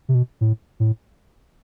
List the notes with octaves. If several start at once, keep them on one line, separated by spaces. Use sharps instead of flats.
C3
B2
A2
A2